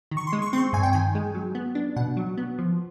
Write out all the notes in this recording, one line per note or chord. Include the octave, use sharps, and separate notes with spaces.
D#3
C#6
C6
G#3
C#6
C4 C6
C#6
G2 G#5
G5
D#3 G#5
G#3
F#3
B3
D4
B2 F#5
F#3
B3
F3